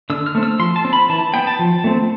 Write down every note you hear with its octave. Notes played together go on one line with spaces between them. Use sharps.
D3 E6
F6
A3 C4
E6
F3 C6
A5
C4
B5
E3 A5
B3 G5
A5
F3
A3 C4